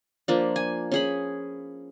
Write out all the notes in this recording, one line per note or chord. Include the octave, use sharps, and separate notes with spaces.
F3 A#3 D4
G#5
C#4 G#4 B5